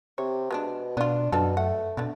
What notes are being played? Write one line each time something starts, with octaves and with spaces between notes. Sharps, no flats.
C3 C#5
B2 G#3 B3 D4
B2 B3 D4 F4
F#2 B2 D4 F4 A4
A3 F#5
B2 D3 D4 D5